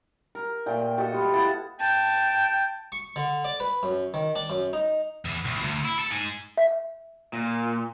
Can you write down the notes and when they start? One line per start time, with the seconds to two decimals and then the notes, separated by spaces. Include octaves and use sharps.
0.35 A#4
0.66 A#2 A3 G5
0.98 F#4 G4 A4 D#5
1.14 B3 F4
1.33 E4 F#5 A5
1.80 G5 A5
2.92 C#6
3.16 D3
3.45 D5
3.60 B4
3.83 F#2
4.14 D#3
4.36 D4
4.50 F#2
4.73 D#4
5.25 E2
5.45 C2
5.62 D2
5.84 E4
5.99 A4
6.12 D#4 G#5
6.57 E5
7.33 A#2